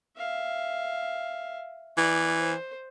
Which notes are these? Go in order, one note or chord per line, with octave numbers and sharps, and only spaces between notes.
E5 F5
E3 D5
C5